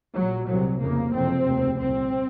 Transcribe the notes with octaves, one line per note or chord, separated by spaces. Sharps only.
A#1 A#2 F#3
C2 C3 F#3
F1 F2 C#3 A#3
F#1 F2 C3 C4
F1 D#2 C#3
C2 A#2 C4